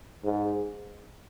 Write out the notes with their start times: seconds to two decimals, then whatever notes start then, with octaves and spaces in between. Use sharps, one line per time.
0.24 G#2